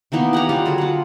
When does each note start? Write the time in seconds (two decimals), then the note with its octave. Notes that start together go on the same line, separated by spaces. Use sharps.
0.12 D#3 E3 A#3 B3
0.33 G4 F#5 G#5 A#5
0.49 G3 C#4 F4 F#5
0.66 D3 F#3 G#4
0.78 F4 F#5